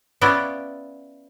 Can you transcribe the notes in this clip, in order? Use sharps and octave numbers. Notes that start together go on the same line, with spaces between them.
B3 C#4 E4 F4 D5